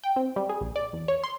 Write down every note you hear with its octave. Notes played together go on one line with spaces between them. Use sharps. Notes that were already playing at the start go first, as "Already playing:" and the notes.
G5
C4
G3
G#4
A#1
D5
E2
C#5
C6